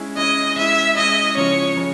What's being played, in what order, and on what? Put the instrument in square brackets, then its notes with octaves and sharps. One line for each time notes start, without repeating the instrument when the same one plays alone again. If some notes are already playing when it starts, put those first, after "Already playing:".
Already playing: [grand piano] G#3 C#4 E4
[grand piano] G#3 C#4 E4 [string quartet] D#5
[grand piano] G#3 C#4 E4 [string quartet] E5
[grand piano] G#3 C#4 E4 [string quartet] D#5
[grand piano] C#3 F3 G#3 C#4 F4 [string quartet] C#5
[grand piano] C#3 F3 G#3